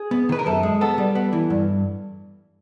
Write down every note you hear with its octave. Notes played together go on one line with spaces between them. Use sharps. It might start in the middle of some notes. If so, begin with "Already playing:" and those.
Already playing: G#4
B3
D#3 B4
A#4
F#2 A4
G#3
B3 A4
G3
B3
E3
G2